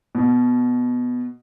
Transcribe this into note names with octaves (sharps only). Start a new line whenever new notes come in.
B2